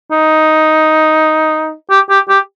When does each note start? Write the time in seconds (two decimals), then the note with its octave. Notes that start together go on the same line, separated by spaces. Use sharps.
0.11 D#4
1.90 G4
2.10 G4
2.29 G4